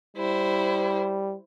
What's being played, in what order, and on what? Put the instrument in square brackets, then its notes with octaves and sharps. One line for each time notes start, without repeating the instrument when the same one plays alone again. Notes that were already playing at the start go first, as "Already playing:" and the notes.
[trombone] G3 [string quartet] E4 C5